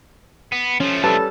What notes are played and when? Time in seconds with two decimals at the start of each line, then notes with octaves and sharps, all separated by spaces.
0.52 B3
0.80 F3 A3 C#4
1.04 G3 A4 B4 A5